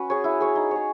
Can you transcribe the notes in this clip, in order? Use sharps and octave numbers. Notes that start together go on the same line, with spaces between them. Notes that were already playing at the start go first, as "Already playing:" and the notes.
Already playing: C#4 F#4 B4
G#4 C#5
E4
G#4 C#5
D#4
G#4 C#5